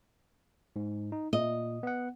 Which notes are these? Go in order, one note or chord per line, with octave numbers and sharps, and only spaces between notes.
G#2
D#4
A#2 D#5
B3 F#5